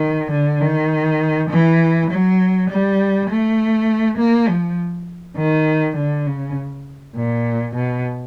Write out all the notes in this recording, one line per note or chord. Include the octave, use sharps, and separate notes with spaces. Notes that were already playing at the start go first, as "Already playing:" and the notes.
Already playing: D#3
D3
D#3
E3
F#3
G3
A3
A#3
F3
D#3
D3
C#3
A#2
B2